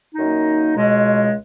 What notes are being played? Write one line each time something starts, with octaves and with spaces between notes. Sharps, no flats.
F#2 D#3 A#3 D#4
C#2 B2 G#3